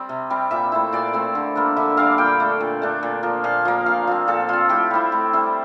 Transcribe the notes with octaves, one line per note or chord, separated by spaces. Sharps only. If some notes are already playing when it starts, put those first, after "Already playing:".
Already playing: G3 C4
C3
G3 C4
A#2 E5
A3 C4 E4
A#2 D5
A3 C4 E4
D3
G3 A#3 D4
D3 E5
G3 A#3 D4 F5
A#2 G5
A3 D4
A#2
A3 D4
A#2
F3 A#3
A#2 F5
F3 A#3
A#2 F5
F3 C4
A#2 A4
F3 C4 F4
A2 G4
G3 C4 E4
A2
G3 C4 E4